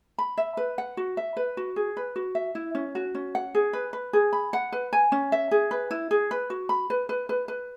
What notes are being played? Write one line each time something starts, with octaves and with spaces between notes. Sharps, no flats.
B5
E5
B4
F#5
F#4
E5
B4
F#4
G#4
B4
F#4
E5
E4
C#4
F#4
C#4
F#5
G#4
B4
B4
G#4
B5
F#5
B4
G#5
C#4
E5
G#4
B4
E4
G#4
B4
F#4
B5
B4
B4
B4
B4